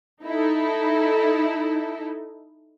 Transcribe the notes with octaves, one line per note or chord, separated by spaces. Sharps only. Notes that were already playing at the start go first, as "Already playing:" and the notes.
D#4 E4 A4